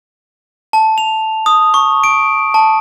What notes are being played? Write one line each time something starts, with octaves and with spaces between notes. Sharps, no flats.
A5
F7
D#6
C#6
D7
A5